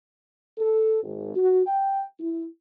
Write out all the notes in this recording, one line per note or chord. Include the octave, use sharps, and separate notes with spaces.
A4
G#1
F#4
G5
E4